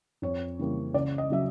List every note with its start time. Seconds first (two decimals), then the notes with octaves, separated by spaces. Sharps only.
0.22 F2 C#5
0.59 C#3 E3 G3 A#3
0.94 C#2 D5
1.18 D#5
1.30 C#3 F#3 E5